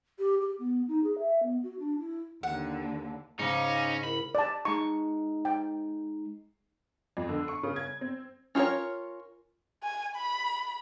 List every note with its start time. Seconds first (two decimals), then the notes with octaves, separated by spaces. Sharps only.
0.19 G4
0.42 G4
0.59 B3
0.88 D#4
1.03 G#4
1.18 E5
1.43 B3
1.63 F#4
1.79 D4
1.99 E4
2.43 D#2 D3 F#5
3.39 G#2 C#3 G#3 C#4 D#4 F5 D6
4.04 E4 A#4 B5
4.35 D5 A5
4.65 G#3 D#4 C#6
5.45 G5
7.17 F2
7.29 D3
7.48 C#6
7.63 C#3
7.76 G#6
8.01 C4
8.55 C#4 F4 F#4 A#4 C#5
9.83 G#5
10.16 B5